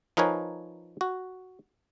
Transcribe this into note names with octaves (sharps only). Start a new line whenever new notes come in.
F3 D#4 A#4 B4 C#5 G#5
F#4